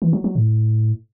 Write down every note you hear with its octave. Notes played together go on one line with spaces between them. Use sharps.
E3
F#3
F#3
A2